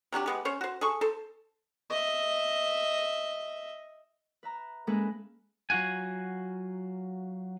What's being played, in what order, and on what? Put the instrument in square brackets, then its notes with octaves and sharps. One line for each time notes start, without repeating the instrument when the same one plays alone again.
[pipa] C3 F#3 D4 G4
G#3 B3 G4
C#4 C5 C#5
F#4 C5
G#4 A4 C#6
A4 C5
[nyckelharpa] D#5 E5
[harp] B4 E5 A#5
G#3 A#3 C#4 G#4 A4 B4
[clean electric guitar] F#3 F4 F#4 F#5 G#5